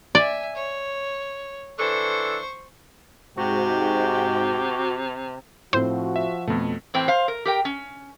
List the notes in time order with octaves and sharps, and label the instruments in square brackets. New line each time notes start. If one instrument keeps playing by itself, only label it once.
[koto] D5 [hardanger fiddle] E5 G#5
[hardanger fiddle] C#5
[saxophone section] E3 D4 A4 [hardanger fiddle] C5 C#6
[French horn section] G#2 [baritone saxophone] C3 [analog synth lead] F#4 [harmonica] G4
[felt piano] A2 C4 [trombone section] F3 F#4 [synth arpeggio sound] C5
[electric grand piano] E5
[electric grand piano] F2 A3 [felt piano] B2
[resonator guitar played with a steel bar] A2 E3 C4 G5
C5 F5
A#4
G4 A#4 G5
C#4